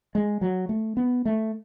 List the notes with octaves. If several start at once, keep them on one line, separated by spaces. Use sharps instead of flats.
G#3
F#3
A3
B3
A3